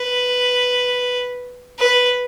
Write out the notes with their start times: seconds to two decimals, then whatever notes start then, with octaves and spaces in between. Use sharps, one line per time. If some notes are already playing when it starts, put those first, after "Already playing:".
Already playing: B4
1.79 B4